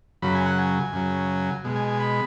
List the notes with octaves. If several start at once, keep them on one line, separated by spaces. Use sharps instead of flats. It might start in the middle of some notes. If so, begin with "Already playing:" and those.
F#2 C#3 F#3 B5
G#5
F#5
G#5
F#2 C#3 F#3
B2 G#3
G#5
G#5
B5